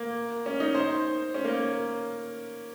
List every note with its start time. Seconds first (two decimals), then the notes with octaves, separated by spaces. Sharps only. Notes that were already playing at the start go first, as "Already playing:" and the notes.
Already playing: A#3
0.46 C#4
0.60 D#4
0.75 C5
1.34 C#4
1.45 A#3